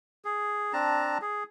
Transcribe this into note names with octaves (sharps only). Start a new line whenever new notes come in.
G#4
C4 D4 A5 A#5
G#4